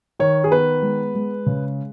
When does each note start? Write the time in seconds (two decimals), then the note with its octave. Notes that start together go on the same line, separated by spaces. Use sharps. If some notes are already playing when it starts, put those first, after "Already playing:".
0.19 D#3 C#5
0.44 G#4
0.51 B3 B4
0.82 G#3
1.15 G#3
1.46 C#3